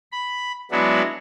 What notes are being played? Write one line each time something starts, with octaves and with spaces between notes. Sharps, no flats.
B5
F#3 G#3 B3 D4 E4 F#4